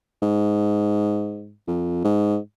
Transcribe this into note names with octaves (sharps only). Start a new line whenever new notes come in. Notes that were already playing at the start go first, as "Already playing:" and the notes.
G#2
F2
G#2